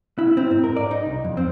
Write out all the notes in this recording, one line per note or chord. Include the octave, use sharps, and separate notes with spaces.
E4
C4
G#2
A#4
D5
D#4
C2
F2
C4